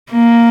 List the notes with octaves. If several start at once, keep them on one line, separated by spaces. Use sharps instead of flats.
A#3